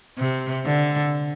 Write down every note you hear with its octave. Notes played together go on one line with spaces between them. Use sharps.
C3
D3